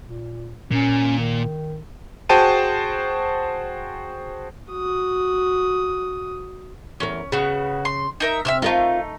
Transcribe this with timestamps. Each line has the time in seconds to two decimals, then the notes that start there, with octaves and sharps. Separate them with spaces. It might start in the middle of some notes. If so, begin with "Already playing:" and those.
0.04 A#2
0.71 A#2 C#4
1.19 D#3
2.29 F#4 G#4 C5 G5 A5 D#7
4.70 F#4 D#6
7.00 E2 C#4 A#4
7.32 C#3 B3 F#4
7.85 C6
8.20 D#4 A#4 E5
8.45 C3 E5 E6 F6
8.62 A3 B3 D#4 F4 A#4 F5